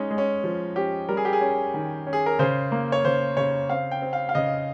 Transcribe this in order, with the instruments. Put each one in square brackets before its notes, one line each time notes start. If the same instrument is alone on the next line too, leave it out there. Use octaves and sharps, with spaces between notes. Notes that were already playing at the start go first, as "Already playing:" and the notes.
Already playing: [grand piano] G#3 C#4 D#4
G#3
C#4
F3
C#4 G4
G3 A#4
G#4
G4
G#4
C#4
D#3
C#4
G#4
A#4
C#3 C5
A#3
C#5
C#3 C5
C#3 C#5
C4 F5
G5
C4
F5
F5
C#3 D#5